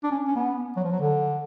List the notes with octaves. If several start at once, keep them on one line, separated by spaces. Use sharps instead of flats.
D4
C#4
C#4
B3
F#3
F3
F#3
D3